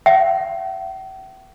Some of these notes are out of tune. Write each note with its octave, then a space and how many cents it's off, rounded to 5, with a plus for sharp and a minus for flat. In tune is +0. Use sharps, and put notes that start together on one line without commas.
E5 +40 G5 -45